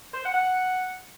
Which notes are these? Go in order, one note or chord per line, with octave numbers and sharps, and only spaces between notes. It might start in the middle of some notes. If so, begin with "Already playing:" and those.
C5
F#5
F#5